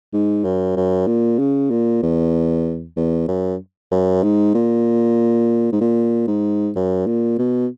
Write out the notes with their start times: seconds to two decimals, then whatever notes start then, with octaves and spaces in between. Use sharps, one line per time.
0.13 G#2
0.45 F#2
0.76 F#2
1.07 A#2
1.39 C#3
1.71 A#2
2.03 E2
2.97 E2
3.28 F#2
3.92 F#2
4.23 G#2
4.54 A#2
5.72 G#2
5.81 A#2
6.28 G#2
6.76 F#2
7.06 A#2
7.38 B2